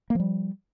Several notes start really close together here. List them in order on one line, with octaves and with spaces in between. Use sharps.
A#3 F3 G3